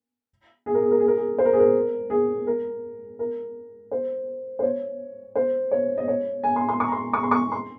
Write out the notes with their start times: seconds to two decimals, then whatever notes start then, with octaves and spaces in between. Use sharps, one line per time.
0.66 G#4
0.74 A#4
0.82 G#4
0.91 A#4
1.00 G#4
1.08 A#4
1.17 G#4
1.38 C5
1.45 A#4
1.53 G#4
1.59 A#4
2.10 G#4
2.47 A#4
3.19 A#4
3.91 C5
4.59 C5
4.63 C#5
5.35 C5
5.71 C#5
5.97 D#5
6.08 C#5
6.43 G#5
6.56 C6
6.69 C6
6.80 C#6
6.88 A#5
6.92 C6
7.13 C#6
7.23 C6
7.31 C#6
7.52 C6